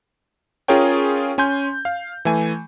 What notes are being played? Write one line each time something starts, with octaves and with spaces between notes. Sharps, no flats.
C#4 F4 G#4 A#4 C#5 G5
C#4 G#5 C6 G6
F5
E3 A3 G#5